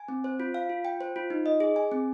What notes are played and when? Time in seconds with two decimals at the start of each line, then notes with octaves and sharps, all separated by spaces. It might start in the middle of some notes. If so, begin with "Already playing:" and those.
Already playing: G#5
0.08 C4
0.24 C5
0.40 F4
0.54 F5
0.70 F4
0.85 G5
1.01 C5
1.16 F4
1.30 D#4
1.46 D#5
1.60 G#4
1.76 G#5
1.92 C4